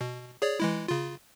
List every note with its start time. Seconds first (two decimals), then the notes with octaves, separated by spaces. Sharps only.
0.01 B2
0.42 G#4 C#5 D5
0.60 E3 G#3 E4
0.88 C#3 F4